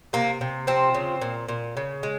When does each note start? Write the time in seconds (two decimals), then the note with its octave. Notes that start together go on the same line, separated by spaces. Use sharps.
0.13 C3 A#3
0.41 C3
0.67 F3 C4
0.94 C#3
1.21 A#2
1.48 A#2
1.77 C#3
2.03 G#3